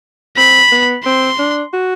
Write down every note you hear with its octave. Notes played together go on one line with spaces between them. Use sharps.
C4 B5
B3
C4 C6
D4
F#4